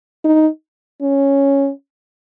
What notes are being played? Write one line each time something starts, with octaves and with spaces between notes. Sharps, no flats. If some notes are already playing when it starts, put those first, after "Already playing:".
D#4
C#4